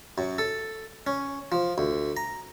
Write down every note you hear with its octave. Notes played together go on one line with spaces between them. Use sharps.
F#2
A4
C#4
F3
D2
A#5